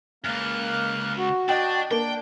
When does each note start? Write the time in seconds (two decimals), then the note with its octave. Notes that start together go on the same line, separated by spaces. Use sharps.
0.24 C#2 F#2 A#3 F6 F#6
1.18 F#4
1.49 D4 D#5 G5
1.91 A#3 D4 G5